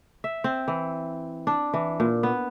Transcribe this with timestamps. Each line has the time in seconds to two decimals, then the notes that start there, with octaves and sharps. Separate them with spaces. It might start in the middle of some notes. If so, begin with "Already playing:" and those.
0.24 E5
0.44 C4
0.68 E3
1.47 D4
1.74 E3
2.00 A#2
2.23 B3